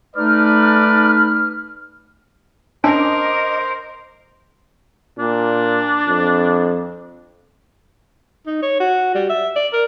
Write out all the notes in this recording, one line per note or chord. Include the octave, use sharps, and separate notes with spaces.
A3 D#4 A4 B4 D5 F6
C#4 D4 A#4 C5 D#5 D6
A#2 D4
F2
D#4
C#5
F#4
G3
E5
D5
A#4